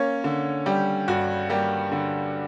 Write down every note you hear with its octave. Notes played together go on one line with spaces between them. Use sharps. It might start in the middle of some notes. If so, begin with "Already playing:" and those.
Already playing: A#3 C#4 C#5
D3
G3 G4
G2 F#4
G3 A#3 G4
D3